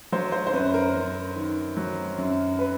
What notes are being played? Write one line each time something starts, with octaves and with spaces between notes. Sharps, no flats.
F#3 C5
C5
C5
F#2 B4
A#4
F#2
D#3
F#3
F#2
B4